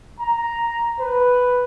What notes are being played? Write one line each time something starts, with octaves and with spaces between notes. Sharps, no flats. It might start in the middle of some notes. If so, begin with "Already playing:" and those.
A#5
B4